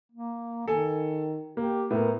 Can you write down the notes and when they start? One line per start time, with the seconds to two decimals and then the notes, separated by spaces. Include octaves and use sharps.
0.12 A#3
0.68 D#3 A4 G#5
1.57 A#3 G4
1.91 A2 B3 A#4